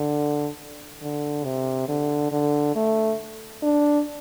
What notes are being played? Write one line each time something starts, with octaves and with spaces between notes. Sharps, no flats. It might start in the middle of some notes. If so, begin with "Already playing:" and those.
Already playing: D3
D3
C3
D3
D3
A3
D4